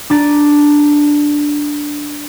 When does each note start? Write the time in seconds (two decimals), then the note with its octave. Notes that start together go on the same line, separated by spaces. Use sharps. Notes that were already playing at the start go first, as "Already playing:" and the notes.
0.10 D4 A#5 D6 A6 B6 D#7